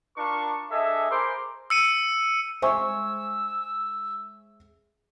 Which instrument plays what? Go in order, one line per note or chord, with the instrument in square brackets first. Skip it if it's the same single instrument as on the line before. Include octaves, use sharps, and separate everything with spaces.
[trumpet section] D4 F4 A#4 A5 C#6
D4 G#4 A4 D#5 E5
G#4 A#4 C5 B5 C6 D6
[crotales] E6 C#7 D#7
[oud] G#3 C5 [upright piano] E5 G#5 C#6 [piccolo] E6